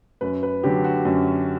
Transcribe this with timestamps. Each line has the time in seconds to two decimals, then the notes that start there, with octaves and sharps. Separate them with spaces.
0.21 F#2 B4
0.43 B4
0.63 D3 F#3 G4
0.84 F#4
1.05 F#2